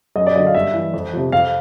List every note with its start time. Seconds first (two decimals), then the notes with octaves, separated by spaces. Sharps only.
0.16 F#2 D#5
0.27 D5
0.35 D3 F#3 D#5
0.47 F5
0.55 G2 E5
0.74 E3
0.93 F2
1.13 C3 F3
1.32 F2 F5